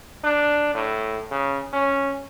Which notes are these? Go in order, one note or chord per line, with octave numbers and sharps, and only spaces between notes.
D4
A2
C#3
C#4